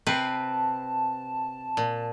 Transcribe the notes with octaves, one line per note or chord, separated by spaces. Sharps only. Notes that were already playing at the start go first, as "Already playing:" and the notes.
C3 C4 B4 A5
A#2